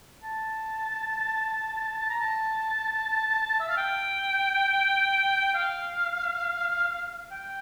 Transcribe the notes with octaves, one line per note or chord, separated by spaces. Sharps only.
A5
A5
A#5
A5
E5
F5
G5
F5
G5